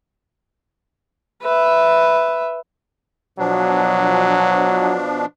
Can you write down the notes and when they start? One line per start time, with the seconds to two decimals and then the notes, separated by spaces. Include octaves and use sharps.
1.43 B4 E5
3.38 B2 F3 F#3 D4